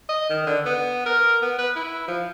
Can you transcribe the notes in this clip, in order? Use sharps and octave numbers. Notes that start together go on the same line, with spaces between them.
D#5
D#3
D3
B3
A#4
B3
B4
E4
F3